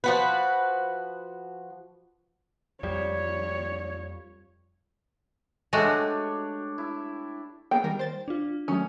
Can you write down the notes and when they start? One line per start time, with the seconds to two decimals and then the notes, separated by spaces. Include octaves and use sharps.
0.04 F3 F#4 B4
2.83 F2 F3 G3 C#5 D5
5.73 G#3 A3 D4 F#4 G4 C#5
6.78 E4
7.71 A#3 B3 G#4 G5
7.84 D#3 G3 A#4
7.99 C5 A6
8.28 D4 F4
8.68 D#3 F#3 A3 C#4 D#6